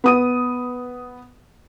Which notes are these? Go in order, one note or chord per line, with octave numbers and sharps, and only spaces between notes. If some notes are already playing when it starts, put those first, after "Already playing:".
B3 D#6 D#7